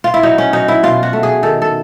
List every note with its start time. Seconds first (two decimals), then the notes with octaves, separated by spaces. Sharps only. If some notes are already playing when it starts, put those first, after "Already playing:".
0.04 F4
0.14 E4
0.23 F#3 D#4
0.38 C#4
0.53 F#3 D#4
0.68 E4
0.83 B2 F4
1.03 F#4
1.13 A3
1.23 G#4
1.43 D#3 A4
1.62 A4